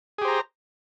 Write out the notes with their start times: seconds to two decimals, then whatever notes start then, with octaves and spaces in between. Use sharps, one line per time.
0.18 G#4
0.22 G4
0.25 C5
0.28 A#5